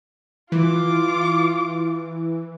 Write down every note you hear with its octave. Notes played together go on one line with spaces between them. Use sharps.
E3 F4 D6